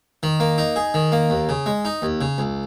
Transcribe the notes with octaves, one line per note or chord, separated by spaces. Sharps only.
D#3
A#3
D#4
G#4
D#3
A#3
D#2
C#3
G#3
D#4
D#2
C#3
C#2